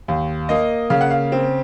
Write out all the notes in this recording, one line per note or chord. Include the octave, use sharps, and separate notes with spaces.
D#2
A#3 D#5
C#3 F5
F#5
F5
C4